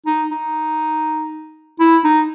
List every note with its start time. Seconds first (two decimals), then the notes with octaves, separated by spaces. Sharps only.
0.07 D#4
0.31 D#4
1.80 E4
2.04 D#4